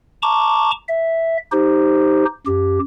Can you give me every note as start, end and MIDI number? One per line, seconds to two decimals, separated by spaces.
0.22 0.71 81
0.22 0.71 82
0.22 0.71 85
0.22 0.71 86
0.89 1.37 76
1.52 2.25 63
1.52 2.25 67
1.52 2.25 72
2.47 2.79 42
2.47 2.79 67